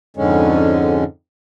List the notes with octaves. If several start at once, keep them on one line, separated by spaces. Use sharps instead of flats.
F2 G#2 D3 G#3 C#4